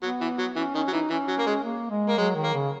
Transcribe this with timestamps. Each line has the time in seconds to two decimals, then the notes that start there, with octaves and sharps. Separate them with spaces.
0.03 F#3 B3
0.21 E3
0.39 F#3
0.56 E3 C#4
0.75 D#3 C#4
0.88 F#3
0.93 E3 D#4
1.10 E3 C#4
1.28 F#3
1.39 A#3
1.47 G#3
1.64 A#3
1.90 G#3
2.09 A#3
2.17 F#3 G#3
2.35 D#3
2.44 A#3
2.53 C#3